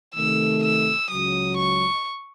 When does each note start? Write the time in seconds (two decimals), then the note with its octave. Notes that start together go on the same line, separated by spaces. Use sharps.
0.15 C3 D#3 A3 E6
0.63 E6
1.10 C#2 C#3 F#3 D#6
1.58 C#6